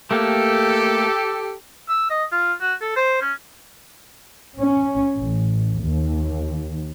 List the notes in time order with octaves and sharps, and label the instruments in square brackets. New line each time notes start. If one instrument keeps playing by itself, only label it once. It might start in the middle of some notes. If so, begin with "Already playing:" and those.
[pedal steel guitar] A3 A#3 [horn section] G4 A4
[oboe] E6
D#5
F4
F#4
A4
C5
C#4
[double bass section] C#4
A1
D#2